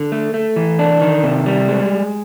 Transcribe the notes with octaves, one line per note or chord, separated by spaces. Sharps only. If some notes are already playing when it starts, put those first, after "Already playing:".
Already playing: D3
A3
A3
E3
D4
D#3
C3
G3
G#3